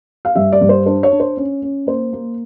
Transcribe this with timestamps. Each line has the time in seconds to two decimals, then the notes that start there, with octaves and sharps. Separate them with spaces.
0.25 F5
0.35 G2 E5
0.52 D5
0.61 G2
0.69 C5
0.86 D4 C5
1.03 C#5
1.12 D4
1.20 C5
1.37 C#4
1.62 C#4
1.87 A#3 C5
2.13 A#3